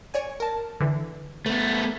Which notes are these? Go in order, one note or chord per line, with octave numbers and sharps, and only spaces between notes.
C#5 D5 G#5
A#4 A5
D3 E3
A3 B3 B4 B6